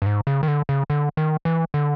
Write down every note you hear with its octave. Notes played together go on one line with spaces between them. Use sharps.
G2
G#2
C#3
D#3
D3
C#3
D3
D#3
E3
D3